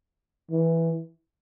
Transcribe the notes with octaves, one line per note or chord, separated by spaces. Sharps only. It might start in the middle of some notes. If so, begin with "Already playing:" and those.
E3